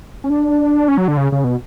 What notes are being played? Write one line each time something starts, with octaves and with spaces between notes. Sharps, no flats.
C#4
D4
C#4
F#3
D3
C#3
C#3
B2